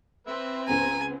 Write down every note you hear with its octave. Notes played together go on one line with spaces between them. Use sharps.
C4 B4 E5
C#2 C#3 B3 G#5 A#5